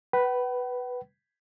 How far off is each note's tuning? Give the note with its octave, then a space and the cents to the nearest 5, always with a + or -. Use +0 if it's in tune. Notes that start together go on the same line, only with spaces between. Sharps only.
B4 +0 F#5 +45